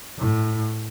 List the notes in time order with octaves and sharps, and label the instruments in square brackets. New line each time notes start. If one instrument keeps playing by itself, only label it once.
[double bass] A2